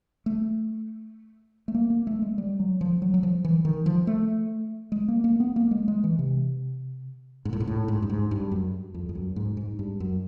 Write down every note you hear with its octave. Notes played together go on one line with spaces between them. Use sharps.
A3
A3
A#3
A#3
A3
G#3
G3
F#3
F3
F#3
F#3
F3
E3
D#3
F3
A3
G#3
A#3
A#3
B3
A#3
G#3
G#3
E3
C3
G#2
A2
G#2
A2
G#2
G2
G#2
G2
F#2
F2
F2
F#2
G#2
G#2
G2
F#2